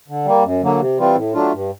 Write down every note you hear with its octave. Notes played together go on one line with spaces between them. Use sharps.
D3
G3 A#3
F#2
D3 F#3 A#3
C3
E3 G3 C4 F4
A2
F#3 A3 D4 F4
G2